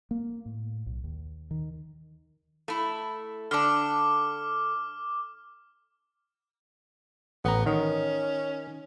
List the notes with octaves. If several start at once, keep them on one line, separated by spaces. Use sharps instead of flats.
A#3
A2
B1
D#2
D#3
A3 E4
D3 D4 D6 F6
A1 B3 A#5
D#3 C#4